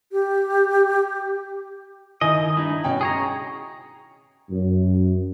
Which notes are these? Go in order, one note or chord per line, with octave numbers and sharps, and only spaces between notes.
G4
D#3 E4 D#5 G#5
G2 D#4 E4
B2 C#4 G5
G#4 C#5 G5 A#5
F#2